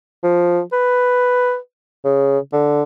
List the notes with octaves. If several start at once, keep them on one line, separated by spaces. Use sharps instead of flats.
F3
B4
C#3
D3